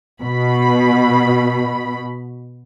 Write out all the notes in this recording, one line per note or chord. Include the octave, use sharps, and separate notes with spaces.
B2 B5